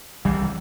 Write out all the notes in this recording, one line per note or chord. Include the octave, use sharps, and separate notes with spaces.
C2 E3 G3